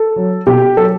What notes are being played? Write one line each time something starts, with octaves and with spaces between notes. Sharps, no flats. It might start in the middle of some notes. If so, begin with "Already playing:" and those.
Already playing: A4
F#3
B2 G4
F#3 A4